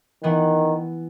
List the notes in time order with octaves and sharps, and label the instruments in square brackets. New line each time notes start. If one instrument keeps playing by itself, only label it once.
[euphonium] D#3 [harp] E3 B3 F#5